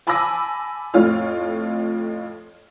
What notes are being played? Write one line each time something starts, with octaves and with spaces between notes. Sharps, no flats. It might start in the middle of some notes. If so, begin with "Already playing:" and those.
G#5 A5 B5 D6 E6 A#6
F2 A2 F4 C#5 F6